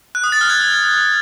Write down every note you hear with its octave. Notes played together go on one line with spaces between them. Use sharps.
F#6
D#6
A6
F6
G#6